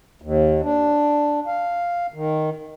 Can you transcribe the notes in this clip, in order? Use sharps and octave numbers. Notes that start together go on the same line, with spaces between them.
D#2
D4
F5
D#3